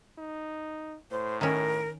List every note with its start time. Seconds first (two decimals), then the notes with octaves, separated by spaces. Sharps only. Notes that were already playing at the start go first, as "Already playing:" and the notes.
0.18 D#4
1.11 A2 C5
1.41 D#3 C#4 A#4